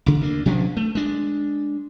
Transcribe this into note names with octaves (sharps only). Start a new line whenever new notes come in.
A1 C#3
D2 A#3 D4
B2 F3 C#4 D4
A3
G#3 D4